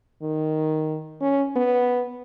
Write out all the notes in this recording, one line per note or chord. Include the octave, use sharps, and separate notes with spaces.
D#3
C#4
B3